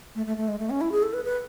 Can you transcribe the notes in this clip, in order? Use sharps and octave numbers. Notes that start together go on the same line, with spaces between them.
A3
A3
A3
G#3
A3
C#4
E4
G#4
A4
B4
B4